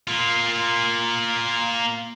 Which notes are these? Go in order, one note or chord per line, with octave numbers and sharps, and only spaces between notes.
A#3 F4